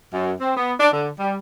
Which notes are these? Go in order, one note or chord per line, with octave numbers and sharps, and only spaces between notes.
F#2
C4
B3
D4
D3
G3